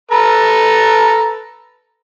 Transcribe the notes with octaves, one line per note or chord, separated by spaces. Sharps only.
A4 B4 A#5